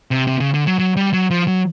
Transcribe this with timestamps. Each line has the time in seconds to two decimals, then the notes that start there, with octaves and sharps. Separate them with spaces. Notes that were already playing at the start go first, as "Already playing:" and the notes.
0.11 C3
0.27 C3
0.40 C#3
0.54 D3
0.67 F#3
0.79 F#3
0.97 G3
1.13 F#3
1.31 F3
1.48 F#3